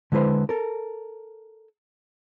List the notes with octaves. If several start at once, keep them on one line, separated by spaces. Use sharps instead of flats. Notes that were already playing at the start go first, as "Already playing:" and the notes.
D3 G#3 E4 B4 C5
A4 A#4